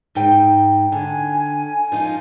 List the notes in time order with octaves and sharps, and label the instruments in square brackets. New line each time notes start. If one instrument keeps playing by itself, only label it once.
[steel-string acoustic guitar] G#2 D#4 G5
[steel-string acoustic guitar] D3 [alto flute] G#5
[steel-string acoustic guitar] F3 D#4 F4